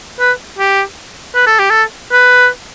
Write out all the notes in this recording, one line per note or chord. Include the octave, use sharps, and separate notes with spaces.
B4
G4
B4
A4
G4
A4
B4